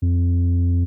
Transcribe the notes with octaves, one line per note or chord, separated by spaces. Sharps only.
F2